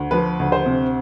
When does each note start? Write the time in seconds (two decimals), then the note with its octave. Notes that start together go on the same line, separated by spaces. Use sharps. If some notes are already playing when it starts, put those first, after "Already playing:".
Already playing: D2
0.11 F3 B4
0.40 D2
0.52 C5
0.66 C3